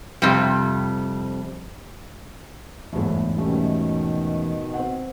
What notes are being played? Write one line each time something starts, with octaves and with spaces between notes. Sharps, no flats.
F2 C3 G3
G1 E2 G#2 A3
B2 D#3 G3 A3 C#4
C4 F#5